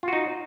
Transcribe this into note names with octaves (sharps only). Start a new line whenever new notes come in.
D#4 F4 F#4